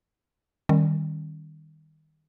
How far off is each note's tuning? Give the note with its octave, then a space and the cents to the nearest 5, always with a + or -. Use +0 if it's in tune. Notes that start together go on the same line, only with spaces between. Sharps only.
D#3 -5 G3 +0 C#4 -30